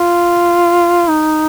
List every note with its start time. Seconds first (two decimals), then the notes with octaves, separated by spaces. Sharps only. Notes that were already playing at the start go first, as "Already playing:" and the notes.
Already playing: F4
1.09 D#4